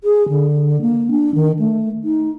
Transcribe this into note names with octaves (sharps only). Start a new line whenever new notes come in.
G#4
D3
A#3
D4
D#3
A3
D#4